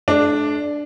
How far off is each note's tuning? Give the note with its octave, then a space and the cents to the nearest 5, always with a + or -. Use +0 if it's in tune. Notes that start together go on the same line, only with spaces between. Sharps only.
A3 -40 D4 +0